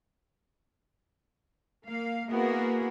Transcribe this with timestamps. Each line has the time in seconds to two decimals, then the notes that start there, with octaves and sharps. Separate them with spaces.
1.86 A#3 F5
2.28 A#3 B3 E4 F#4 G#4 A#4